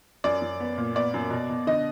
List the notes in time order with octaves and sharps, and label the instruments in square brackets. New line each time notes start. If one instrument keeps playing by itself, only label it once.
[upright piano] F#2 D5
F#2
B3
A#2
B3 D5
F#2
B2
B2
D3 D#5